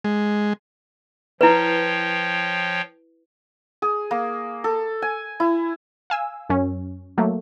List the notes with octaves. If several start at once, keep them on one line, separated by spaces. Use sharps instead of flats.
G#3
F3 E4 B4 C#5 G5
G#4
A#3
A4
G#5
E4
F5 G#5 E6
F#2 C#4
F#3 A3 A#3